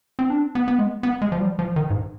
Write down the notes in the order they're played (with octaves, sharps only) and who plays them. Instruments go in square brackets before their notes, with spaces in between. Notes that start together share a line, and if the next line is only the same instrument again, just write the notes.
[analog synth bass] C4
D4
B3
B3
G#3
B3
G#3
F3
G3
F3
D#3
G#2